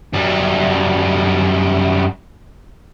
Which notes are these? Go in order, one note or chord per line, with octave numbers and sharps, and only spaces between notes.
F#2 G3